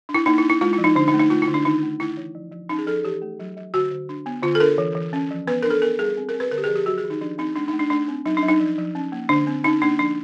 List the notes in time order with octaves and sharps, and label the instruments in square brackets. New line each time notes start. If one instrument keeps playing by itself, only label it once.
[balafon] D4
E4
A#3 D#4
E4
D4
E4
G#3 F4
E4
F3
D#4
D3 D4
D#4
A3
D#4
A3 F4
E4
D3
D4
D#3 D#4
A3
A3 E4
E3
F3
F3
C#4 D#4
G#4
F3 A4
G#4
E3 G4
A3
F#3
F#3
D3 F#4
D3
D4
B3
D3 F4
A4
D4 A#4
E3
E3
C#4
F3
B3 B4
D4 A#4
A4
B3 A#4
G3 G#4
C4
A#4
C4
B4
D3 A#4
G4
F3 G#4
G4
F#3 F#4
G#4
D#3
D#4
F3 D4
C4 D#4
A3 D4
D#4
A3
D4
A3 D4
C4
F#3 D#4
D4
F#3
D#4
F3
F3
C#4
A#3
D3 D4
C4
C#4 D#4
A#3 D4
F3 D4